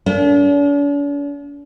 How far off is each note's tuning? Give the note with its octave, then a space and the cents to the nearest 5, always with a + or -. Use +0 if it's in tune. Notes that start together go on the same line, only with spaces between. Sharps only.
A#3 -20 D4 -45